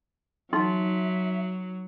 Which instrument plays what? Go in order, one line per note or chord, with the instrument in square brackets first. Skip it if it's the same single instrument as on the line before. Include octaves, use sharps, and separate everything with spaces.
[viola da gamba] F#3 [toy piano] D#4 C6 [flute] E5